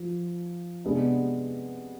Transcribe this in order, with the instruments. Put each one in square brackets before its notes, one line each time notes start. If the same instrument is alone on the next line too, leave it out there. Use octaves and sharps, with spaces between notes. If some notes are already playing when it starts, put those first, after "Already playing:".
Already playing: [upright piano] F3
C3 G#3 B3 D4